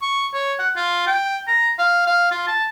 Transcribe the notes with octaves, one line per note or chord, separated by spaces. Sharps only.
C#6
C#5
F#5
F4
G5
A#5
F5
F5
F4
A5